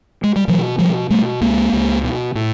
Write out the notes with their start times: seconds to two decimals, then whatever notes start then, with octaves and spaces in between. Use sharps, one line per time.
0.23 G#3
0.36 G3
0.48 B2 E3 F#3
0.79 B2 F3 G3
1.10 B2 G3 A3
1.41 C#2 G#3 A#3
1.73 C#2
2.04 B2
2.35 A2